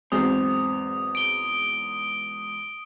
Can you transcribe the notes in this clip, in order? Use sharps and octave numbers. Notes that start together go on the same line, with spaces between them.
E2 G#2 F#3 C4 D#6
D7 G7